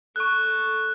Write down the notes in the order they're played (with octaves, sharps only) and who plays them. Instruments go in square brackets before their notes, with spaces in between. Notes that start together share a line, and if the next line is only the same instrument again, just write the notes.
[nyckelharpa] A4 [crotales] C#6 F#6